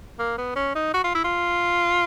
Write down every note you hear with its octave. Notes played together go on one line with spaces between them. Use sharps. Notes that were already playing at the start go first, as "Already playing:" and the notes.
A#3
B3
C#4
D#4
F#4
F4
E4
F4